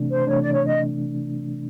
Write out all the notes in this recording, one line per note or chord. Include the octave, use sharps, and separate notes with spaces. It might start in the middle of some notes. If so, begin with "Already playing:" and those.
Already playing: C3 E3 A3 D4
C5
C3 E3 A3 D4 C#5
D5
C#5
D#5